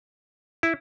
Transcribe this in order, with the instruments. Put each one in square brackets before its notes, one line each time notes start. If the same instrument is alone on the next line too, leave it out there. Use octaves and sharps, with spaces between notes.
[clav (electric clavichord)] E4